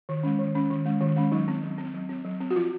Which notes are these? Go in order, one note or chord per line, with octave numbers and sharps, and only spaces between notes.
D#3
G#3 C#4
D#3
G#3 C#4
D#3
G#3 C#4
D#3
G#3 C#4
F#3 D#4
C4
F#3
C4
F#3
C4
F#3
C4
F#4
F3 F4